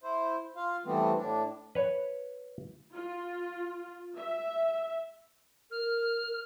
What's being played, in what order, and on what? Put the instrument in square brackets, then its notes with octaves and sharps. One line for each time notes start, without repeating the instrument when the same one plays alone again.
[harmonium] E4 C5
F4 F5
E3 G3 A3 B3 C4
A2 D4
[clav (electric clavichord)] B4 C#5
[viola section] F4
E5
[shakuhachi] A#4 [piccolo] F6